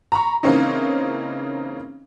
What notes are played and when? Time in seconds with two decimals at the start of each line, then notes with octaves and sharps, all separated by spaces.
0.12 A#5 B5 C#6
0.43 C#3 E3 A#3 C4 C#4 D#4